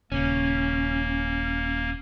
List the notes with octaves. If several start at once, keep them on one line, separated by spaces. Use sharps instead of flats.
D#1 C#3 A#3 C#4